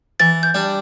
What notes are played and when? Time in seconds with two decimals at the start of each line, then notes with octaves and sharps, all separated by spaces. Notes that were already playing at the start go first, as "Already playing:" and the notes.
0.20 E3 A6
0.43 G6
0.54 G3 D4